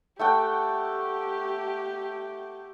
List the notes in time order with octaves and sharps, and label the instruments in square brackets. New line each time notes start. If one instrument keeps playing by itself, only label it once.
[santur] A3 F#5 G5 [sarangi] G4